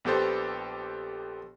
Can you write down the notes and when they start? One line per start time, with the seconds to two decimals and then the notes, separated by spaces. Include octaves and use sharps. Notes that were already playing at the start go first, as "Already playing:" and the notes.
0.05 A#1 B3 G4 A4 C5